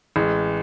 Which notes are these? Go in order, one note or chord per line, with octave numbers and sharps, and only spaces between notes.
A1 G#3